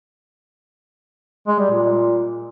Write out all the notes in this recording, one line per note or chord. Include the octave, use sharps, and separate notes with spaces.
G#3
G3
A#2